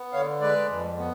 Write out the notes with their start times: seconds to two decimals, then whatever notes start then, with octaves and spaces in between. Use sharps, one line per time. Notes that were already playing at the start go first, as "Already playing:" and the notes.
Already playing: B3
0.13 D3 C#5 F5
0.41 G#3 B4 D5
0.69 F2
0.98 B3